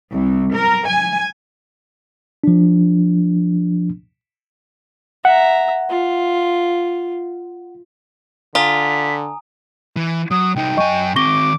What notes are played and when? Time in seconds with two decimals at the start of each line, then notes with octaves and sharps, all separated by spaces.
0.11 C2
0.54 A#4
0.87 G#5
2.44 F3 D4
5.25 E5 F#5 A#5
5.90 F4
8.55 D3 F4 G#5 A#5 D#6 B6
9.96 E3
10.31 F#3 D#6
10.56 C2 D#4 G5
10.77 F#2 D#5 G#5 C#6
11.16 D#3 C4 C#6 D6 A#6 G7